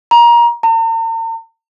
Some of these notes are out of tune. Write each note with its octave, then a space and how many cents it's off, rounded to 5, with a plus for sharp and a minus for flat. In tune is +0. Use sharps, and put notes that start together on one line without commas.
A#5 +25
A#5 -45